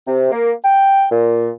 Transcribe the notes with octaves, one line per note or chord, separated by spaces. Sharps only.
C3
A#3
G5
A#2